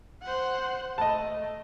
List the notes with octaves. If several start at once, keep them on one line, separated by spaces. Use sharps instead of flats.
C5 F#5
A3 D#5 A5